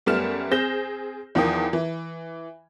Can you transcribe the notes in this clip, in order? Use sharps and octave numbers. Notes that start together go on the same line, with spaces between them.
F#2 G3 A3 B3 F6 E7
C4 G#4 G6 A#6 E7
E2 D#3 F3 G5 D#6
E3